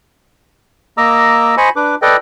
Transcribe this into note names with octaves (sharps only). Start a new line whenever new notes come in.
A#3 D#5 A#5 D6 E6
C5 D#5 G#5 B5 C#6
D4 B4 D6
A4 B4 D5 D#5 G5